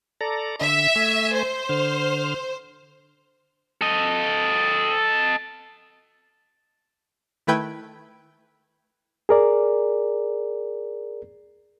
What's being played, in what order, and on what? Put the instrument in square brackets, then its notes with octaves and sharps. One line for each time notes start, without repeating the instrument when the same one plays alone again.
[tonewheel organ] A4 D5 A#5
[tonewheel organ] D3 [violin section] E5
[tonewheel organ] A3 G#5
[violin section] C5
[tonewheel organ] D3 F6
[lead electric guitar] A4 D#5
[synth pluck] D#3 A3 E4 B4 G5 G#6
[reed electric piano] G#4 A#4 D5